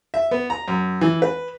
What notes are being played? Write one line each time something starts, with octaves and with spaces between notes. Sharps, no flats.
E5
B3
A#5
F#2
E3
B4